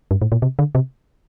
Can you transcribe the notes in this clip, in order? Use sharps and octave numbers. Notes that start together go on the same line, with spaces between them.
G2
A2
A#2
C3
D3
C3